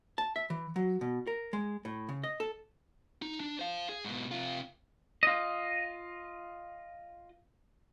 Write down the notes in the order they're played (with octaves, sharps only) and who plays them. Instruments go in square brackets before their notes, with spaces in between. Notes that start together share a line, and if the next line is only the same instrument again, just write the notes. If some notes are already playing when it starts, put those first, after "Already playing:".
[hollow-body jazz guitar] A5
E5
E3
F#3
B2
A#4
G#3
A2
C#3
D#5
A4
[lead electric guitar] D#4
D4
C5 F5
G#4
G#2 B2
C3 F4
[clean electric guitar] F4 D#5